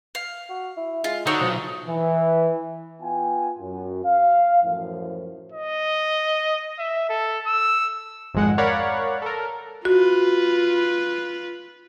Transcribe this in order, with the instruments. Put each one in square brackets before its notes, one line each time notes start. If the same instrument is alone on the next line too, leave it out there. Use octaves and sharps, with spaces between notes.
[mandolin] F5
[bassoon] F#4
E4
[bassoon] G#3 [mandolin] F4
[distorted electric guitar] D3 [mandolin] D#4 F#4 C#5
[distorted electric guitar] B1 [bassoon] F3
[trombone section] E3
[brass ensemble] B3 F4 G5 G#5
F#2
F5
F#2 A2 E3 F3
[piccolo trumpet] D#5
E5
A4
E6
[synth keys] G#1 F2 G#3 F#5
A#4 C#5 D5 F5 F#5 B5
A4 A#4
[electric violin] F4 B4 [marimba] F#4